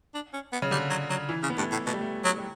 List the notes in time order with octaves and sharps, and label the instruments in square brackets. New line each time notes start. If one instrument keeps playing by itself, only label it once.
[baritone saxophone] D4
C#4
B3
[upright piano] C#3
[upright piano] D3 [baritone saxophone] G3
[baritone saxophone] F#3
F#3
[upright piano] E3
[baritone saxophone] C#3
[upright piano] B3
[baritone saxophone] G2 [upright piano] A3
[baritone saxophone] A2
[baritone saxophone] B2 [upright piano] A3
[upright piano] G3
A3
[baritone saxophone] F#3
[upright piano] G3